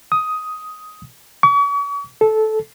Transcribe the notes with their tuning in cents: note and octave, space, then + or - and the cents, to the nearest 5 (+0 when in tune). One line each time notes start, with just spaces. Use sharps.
D#6 +10
C#6 +40
A4 -15